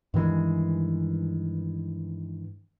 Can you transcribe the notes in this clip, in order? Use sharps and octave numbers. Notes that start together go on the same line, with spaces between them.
G2 D#3 E3 G#3